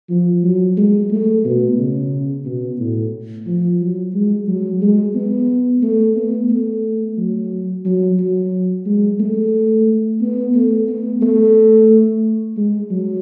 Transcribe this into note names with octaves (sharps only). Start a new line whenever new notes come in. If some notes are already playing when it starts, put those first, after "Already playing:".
F3
F#3
G#3
A3
B2
C#3
B2
A2
F3
F#3
G#3
F#3
G#3
B3
A3
B3
A3
F#3
F#3
F#3
G#3
A3
B3
A3
B3
A3
G#3
F#3